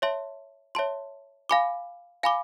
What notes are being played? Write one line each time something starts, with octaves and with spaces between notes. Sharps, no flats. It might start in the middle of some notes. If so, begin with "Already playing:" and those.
C#5 E5 A5 C6
C#5 E5 A5 C6
F5 G#5 B5 D6
F5 G#5 B5 D6